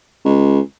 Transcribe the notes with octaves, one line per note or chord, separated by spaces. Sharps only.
C#2